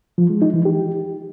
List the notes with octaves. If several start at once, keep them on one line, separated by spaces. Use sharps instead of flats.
F3
G#3
D#4
E3
G4